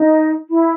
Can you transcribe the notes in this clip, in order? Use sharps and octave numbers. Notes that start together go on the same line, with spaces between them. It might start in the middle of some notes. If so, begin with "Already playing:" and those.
Already playing: D#4
E4